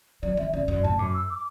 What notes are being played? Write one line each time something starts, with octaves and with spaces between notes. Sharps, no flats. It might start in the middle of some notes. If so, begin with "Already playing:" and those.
F#3 D5
E3 E5
F#2 D5
F#2 D5
A2 A5
F#2 D6
E6
D6